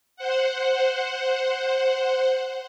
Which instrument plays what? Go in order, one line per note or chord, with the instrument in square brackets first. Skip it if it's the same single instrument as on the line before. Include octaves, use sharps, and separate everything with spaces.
[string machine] C5 F#5